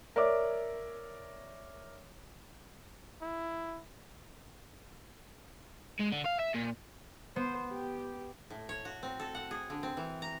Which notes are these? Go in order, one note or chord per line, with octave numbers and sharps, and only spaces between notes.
A#4 C#5 D5 E5 D6
E4
G#3
D3
F5
E5
A#2
B3 C5
G4
A2
C#5
F#4
C4
A4
F#5
G#4
D3
C4
E3
A#5